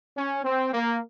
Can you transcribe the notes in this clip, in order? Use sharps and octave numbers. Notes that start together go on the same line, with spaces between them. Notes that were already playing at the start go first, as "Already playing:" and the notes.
C#4
C4
A#3